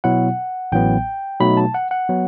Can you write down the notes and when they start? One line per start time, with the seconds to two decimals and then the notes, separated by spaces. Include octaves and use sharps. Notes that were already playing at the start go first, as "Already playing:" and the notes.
0.04 B2 F#3 B3 E4 F#5
0.72 A1 A2 F#3 B3 G5
1.40 B2 F#3 A3 D#4 B5
1.57 A5
1.74 F#5
1.91 F#5
2.09 F#3 B3